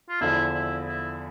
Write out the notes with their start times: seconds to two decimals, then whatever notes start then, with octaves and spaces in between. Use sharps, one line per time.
0.09 F4
0.21 E2 D3 F3 E4
0.54 E4
0.87 E4